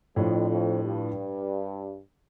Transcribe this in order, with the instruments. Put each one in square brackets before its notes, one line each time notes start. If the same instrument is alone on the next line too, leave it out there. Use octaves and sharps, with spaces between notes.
[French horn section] F2 [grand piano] A2 F3 D4
[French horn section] F2
G2